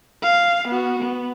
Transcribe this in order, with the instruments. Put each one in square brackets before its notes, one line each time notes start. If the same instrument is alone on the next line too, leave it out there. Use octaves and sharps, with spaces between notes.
[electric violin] F5
B3 F#4
B3